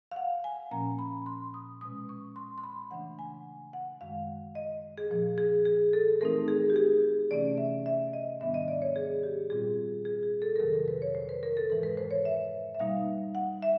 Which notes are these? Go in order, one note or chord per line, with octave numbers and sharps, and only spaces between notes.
F5
F#5
G#5
A#2 F3 A#3 C#4 A#5
B5
C6
D#6
B2 G#3 C#4 D#6
C#6
C6
C6
B5
C#3 E3 A3 D4 F#5
G#5
F#5
F#2 D#3 G#3 F5
D#5
G#4
A#2 F3 A#3
G#4
G#4
A4
E3 A3 C4 D#4 A#4
G#4
G4
G#4
C3 E3 A3 C#4 D5
E5
E5
D#5
G#2 D#3 G3 B3 D4 E5
D#5
D5
C#5
G#4
G4
A#2 G3 C4 F4 G#4
G#4
G#4
A4
A#4
F2 C3 D#3 F#3 A#3 A4
A#4
B4
C#5
C5
B4
A#4
A4
G#2 E3 G#3 A#4
B4
C5
C#5
E5
E5
B2 G3 A#3 D#4 F5
F#5
E5